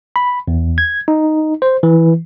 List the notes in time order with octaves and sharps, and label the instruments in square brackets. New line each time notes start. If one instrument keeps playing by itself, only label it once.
[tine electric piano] B5
E2
G#6
D#4
C5
E3